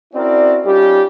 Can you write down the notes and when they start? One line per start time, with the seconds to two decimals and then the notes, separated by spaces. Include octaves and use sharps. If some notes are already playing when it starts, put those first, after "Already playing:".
0.14 C4 C#4 E4 F#4 A#4 D5
0.65 G3 C#4 D#4 F4 G4